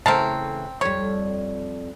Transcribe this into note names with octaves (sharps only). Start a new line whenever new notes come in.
C#3 E3 A3 C4 A#4 A5
F2 G3 C#5